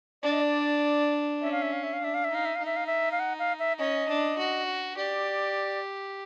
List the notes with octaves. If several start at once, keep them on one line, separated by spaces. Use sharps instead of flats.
D4 D5
D#5
D5
C#4 E5
F5
E5
F5
E5
F5
D4 E5
F5
E5
D#4 F5
E5
D#4 F5
E5
F5
E5
F5
F#5
F5
E5
C#4 D#5
D4
F#4
G4 D5